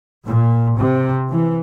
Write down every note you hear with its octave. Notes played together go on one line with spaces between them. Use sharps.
A#2
C3
E3